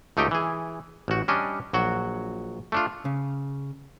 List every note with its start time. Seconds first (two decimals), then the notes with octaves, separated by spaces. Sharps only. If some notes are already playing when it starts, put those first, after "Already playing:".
0.17 C#2 A3 D#4 G4 G5
0.31 E3 G#4
1.08 A1 F#4
1.28 G3 C#4 D4 D#5
1.73 A#1 F#3 F#4
2.72 A3 D4 F4
3.05 C#3